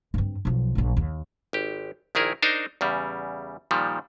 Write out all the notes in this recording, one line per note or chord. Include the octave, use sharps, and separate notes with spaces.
G2 C4
B1 F3
A#1 F#3
D#2
G#1 G4
A#1 D#3 E4 G#4 A#4
D4 D#4 A#4 C5
E2 C#3 G3
A#2 D#3 F3 G3